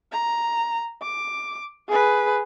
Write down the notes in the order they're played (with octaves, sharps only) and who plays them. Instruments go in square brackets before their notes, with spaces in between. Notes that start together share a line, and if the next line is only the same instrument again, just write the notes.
[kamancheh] A#5
D6
G#4 B4